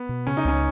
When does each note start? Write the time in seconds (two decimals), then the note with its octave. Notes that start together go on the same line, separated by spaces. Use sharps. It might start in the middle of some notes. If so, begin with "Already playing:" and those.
Already playing: B3
0.09 B2
0.27 C#3 C#4
0.37 D#4
0.44 C#2 C#4